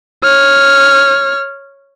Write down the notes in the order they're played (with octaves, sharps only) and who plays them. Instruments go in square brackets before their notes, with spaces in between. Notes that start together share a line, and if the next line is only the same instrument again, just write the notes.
[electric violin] C#5 F6